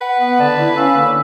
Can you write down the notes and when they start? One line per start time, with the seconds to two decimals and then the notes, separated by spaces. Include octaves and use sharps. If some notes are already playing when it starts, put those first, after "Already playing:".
0.01 B4 F#5
0.19 B3
0.40 D3 D5 A5
0.59 E4
0.77 C#4 F5 E6
0.96 D3 A#3